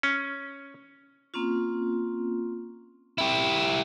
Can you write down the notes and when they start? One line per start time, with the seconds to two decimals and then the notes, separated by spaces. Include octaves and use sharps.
0.03 C#4
1.34 A#3 C4 C#4 F4
3.18 E4 G4